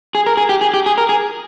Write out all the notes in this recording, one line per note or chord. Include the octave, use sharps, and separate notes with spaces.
G#4
A#4
G#4
G4
G#4
G4
G#4
A#4
G#4